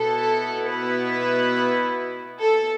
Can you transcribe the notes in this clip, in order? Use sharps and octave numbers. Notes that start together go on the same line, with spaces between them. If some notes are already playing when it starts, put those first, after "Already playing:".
Already playing: B2 B3 E4 A4
B4
A4